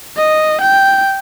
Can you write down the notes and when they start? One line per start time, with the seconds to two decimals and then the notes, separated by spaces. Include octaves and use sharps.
0.17 D#5
0.61 G5